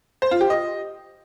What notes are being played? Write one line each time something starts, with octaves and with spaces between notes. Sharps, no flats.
C5
F4
G4
D#5